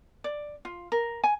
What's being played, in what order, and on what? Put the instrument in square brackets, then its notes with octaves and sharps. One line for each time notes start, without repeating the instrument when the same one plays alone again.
[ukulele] D5
F4
A#4
G#5